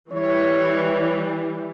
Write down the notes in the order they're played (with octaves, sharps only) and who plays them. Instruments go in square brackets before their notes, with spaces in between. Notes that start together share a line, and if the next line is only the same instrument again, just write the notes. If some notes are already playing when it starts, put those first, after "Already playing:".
[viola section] E3 G3 [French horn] C#5